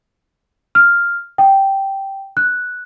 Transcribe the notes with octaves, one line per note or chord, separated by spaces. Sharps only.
F6
G5
F#6